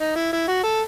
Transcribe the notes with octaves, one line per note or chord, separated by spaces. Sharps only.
D#4
E4
E4
F#4
A4